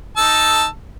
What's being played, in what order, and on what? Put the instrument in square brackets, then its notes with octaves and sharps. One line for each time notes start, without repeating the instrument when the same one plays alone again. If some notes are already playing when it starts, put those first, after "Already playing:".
[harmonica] D#4 A5 E6